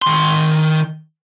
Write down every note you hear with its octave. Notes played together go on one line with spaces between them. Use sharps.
D#3 C6